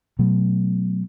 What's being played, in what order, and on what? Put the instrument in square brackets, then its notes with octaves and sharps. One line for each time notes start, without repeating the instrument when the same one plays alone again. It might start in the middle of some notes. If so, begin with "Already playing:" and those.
[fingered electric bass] B2 F#3 A3